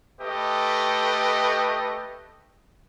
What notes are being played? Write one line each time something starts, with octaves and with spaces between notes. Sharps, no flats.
A3 G4 B4 D#5